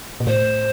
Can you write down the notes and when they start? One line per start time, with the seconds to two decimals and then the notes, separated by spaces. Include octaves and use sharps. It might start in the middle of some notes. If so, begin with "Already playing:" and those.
0.20 A#2
0.27 A2 C5